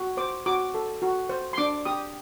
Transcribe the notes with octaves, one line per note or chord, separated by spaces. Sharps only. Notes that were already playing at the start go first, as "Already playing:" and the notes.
Already playing: F#4
C5 D6
F#4 D6
A4
F#4
C5
C6
D4 D6
G4 D#6